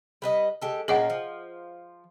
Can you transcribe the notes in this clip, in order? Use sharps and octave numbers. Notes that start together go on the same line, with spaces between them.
G3 B4 D#5
G#3 G4 A4
A#2 A#3 C#4 G#4 D#5 F#5
F3